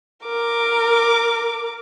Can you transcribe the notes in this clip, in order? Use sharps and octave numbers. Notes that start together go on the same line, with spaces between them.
A#4 D6